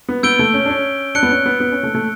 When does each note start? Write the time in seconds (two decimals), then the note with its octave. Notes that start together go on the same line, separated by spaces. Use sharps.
0.09 B3
0.23 B3 E6 G6 D7 G7
0.39 A3
0.54 C#4
0.65 D4
0.70 C#4
1.15 D4 F#6 C#7 G7
1.23 B3
1.30 C#4
1.46 B3
1.60 B3
1.72 C#4
1.83 A3
1.95 A3